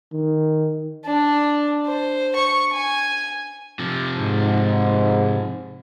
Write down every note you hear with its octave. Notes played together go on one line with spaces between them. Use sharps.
D#3
D4
C5
C#6
G#5
C3 F3
G#2